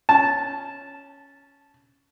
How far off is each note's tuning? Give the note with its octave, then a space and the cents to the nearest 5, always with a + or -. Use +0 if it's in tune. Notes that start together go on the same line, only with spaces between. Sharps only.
C#4 +5 A5 -10